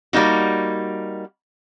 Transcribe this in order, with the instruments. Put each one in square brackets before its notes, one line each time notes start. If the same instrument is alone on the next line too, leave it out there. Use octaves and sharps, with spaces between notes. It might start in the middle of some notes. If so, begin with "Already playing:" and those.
[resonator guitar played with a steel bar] G3 A#3 D#4 F#4